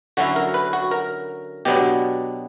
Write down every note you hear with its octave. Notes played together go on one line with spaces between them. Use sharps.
D3 F#3 C#4 E4 F#4
A#4
B4
F#4
A#4
B2 F#3 B3 D4 G4